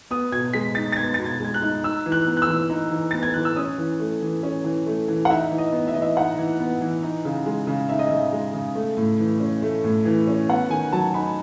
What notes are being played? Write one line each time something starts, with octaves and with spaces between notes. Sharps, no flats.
B3 D#6
B2 G#6
G#3 B6
D#4 A6
A6
B3 G#6
B2 A6
G#6
G#3 G#6
F#6
D#4
D#4 E6
E3
F#6
B3
F#6
E6
E3
D#4
E3
B3 A6
G#6
E3 F#6
E6
C#4 D#6
E3
A3
E3
C#4
E3
A3
E3
F#5
D#4 E5
E3
D#5
B3
E5
E3 D#5
E5
D#4 F#5
E3
B3
E3
D#4
C#3
G#3
C#3
D#4 E5
D#5
C#3 E5
G#3
C#3
A3
A2
E3
C#4
A3
A2
E3
C#4
B3 F#5
D#3 G#5
F#3 A5
D#4 B5